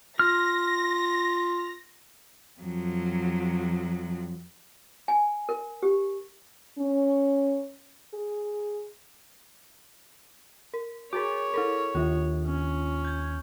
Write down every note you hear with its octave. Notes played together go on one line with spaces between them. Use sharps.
F4 F6 A#6
F2 F#3
G#5
A#4
G4
C#4
G#4
A#4
F#4 G#4 A#4 C#5 D6
E4 A4 A#4
D#2 D#3 D4 F4
C#4
G6 G#6